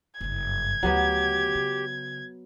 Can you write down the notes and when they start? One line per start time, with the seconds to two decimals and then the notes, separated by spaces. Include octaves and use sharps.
0.21 F#1 G2 G#6
0.83 D2 C#3 F#3 B3 G4 B4
1.55 C#3